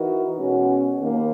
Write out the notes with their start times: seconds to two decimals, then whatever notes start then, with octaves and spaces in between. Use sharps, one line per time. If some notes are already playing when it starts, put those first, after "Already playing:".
Already playing: E3 D#4 F#4 A#4
0.37 B2 G#3 C#4 F#4
1.00 D#2 D#3 A#3